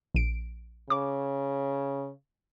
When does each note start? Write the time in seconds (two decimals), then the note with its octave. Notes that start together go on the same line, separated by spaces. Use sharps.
0.14 A#1 D7
0.90 C#3 D6